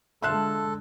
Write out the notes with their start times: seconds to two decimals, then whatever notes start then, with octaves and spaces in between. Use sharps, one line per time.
0.22 D3 G#3 F4 A4 E5 A5 C6 F#6